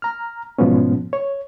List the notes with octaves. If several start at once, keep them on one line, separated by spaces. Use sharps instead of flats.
A#5 F6
G#2 B2 F3 G#3 B3 C#4
C#5